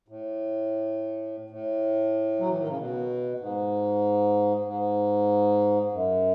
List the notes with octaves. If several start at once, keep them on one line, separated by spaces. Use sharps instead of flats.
A2
A2
F#3
E3
D#3
C#3
B2
G#2
G#2
F#2